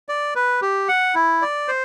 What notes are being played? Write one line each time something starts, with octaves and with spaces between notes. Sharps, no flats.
D5
B4
G4
F#5
E4
D5
C5